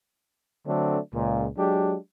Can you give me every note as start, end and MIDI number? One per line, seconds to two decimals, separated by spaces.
0.67 0.98 50
0.67 0.98 54
0.67 0.98 57
0.67 0.98 60
0.67 0.98 62
1.13 1.47 37
1.13 1.47 46
1.58 1.96 54
1.58 1.96 56
1.58 1.96 62
1.58 1.96 67